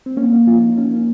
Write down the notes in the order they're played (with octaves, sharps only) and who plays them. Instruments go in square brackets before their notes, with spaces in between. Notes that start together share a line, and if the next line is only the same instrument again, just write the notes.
[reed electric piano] C4
[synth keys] A#3 [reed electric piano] C#4
[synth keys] A#3
[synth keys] F3 [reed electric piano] F4
[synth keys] D#4
[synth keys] A#3 [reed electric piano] C#4
[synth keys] A#3